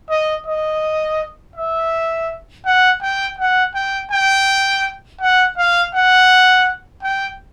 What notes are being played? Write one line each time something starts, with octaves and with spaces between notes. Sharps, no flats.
D#5
D#5
E5
F#5
G5
F#5
G5
G5
F#5
F5
F#5
G5